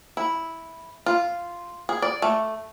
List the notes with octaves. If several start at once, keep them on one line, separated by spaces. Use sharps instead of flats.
E4
F4
G#4
D5
A3